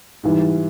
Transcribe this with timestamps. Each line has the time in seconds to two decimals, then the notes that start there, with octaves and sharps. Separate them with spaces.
0.23 G#2 E3 G3